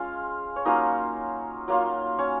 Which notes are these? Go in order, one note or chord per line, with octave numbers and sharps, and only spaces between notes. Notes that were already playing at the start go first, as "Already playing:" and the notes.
Already playing: G#3 C#4 F4 F5
C#5
F#3 A#3 C#4 D#4 F4 D#5
F#3 A#3 F4
C#4 C#5